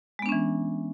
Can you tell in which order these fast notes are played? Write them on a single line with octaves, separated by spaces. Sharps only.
G#3 B3 D4 C#4 E3